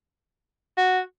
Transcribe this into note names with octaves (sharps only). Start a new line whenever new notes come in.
F#4